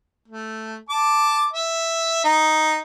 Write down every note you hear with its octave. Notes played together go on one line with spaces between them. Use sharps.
A3
A5 D6
E5
D#4